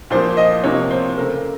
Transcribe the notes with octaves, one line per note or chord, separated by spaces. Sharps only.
A#2 F3 A#3 C5
D#5
C3 F3 A#3 C#5
C5
C#3 A3 A#4